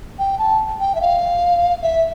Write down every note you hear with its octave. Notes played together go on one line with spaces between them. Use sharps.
G5
A5
G5
E5
F5
E5